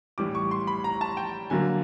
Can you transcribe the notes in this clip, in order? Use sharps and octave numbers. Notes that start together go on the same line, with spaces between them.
A2 E3 G3 D6
C#6
C6
B5
A#5
A5
G5
D3 F#3 A#3 G#5